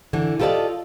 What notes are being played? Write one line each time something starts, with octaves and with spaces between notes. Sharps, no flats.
D3 E3
F4 G4 A4 A#4 D5 D#5